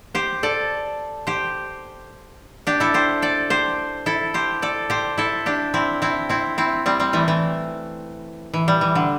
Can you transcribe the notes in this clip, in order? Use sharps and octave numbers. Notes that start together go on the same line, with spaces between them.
G4 C5
A4 D5
G4 C5
D4 G4
E4 A4
G4 C5
A4 D5
G4 C5
E4 A4
G4 C5
A4 D5
G4 C5
E4 A4
D4 G4
C4 E4
C4 E4
C4 E4
C4 E4
G3 C4
G3 C4
E3 A3
E3
E3
G3
E3
D3